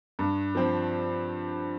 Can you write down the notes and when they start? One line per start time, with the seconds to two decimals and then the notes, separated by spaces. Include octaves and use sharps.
0.19 G2
0.55 F3 C4